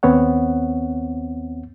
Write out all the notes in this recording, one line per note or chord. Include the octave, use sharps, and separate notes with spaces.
D#2 B3 C4 C#5 F#5